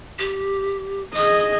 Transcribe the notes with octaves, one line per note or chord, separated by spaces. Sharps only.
G4
G#4 D#5 D#6